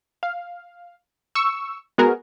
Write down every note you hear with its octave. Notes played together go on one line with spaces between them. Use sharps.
F5
C#6 E6
G#3 B3 F#4 G#4 A#4